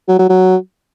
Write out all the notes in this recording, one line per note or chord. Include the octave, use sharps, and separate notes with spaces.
F#3
F#3
F#3